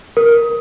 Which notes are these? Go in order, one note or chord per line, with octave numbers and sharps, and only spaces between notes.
A#4